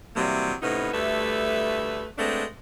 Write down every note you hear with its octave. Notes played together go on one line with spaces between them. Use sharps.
C3 E3 F#3 G3 A#3
A2 C3 B3 C#4 D#4
D2 G3 A3 B4 E5
G#3 A3 B3 C4 D4